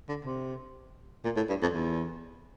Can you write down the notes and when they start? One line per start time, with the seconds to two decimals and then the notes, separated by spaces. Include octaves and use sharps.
0.09 D3
0.25 C3
1.24 A#2
1.36 A2
1.49 G2
1.62 F2
1.74 E2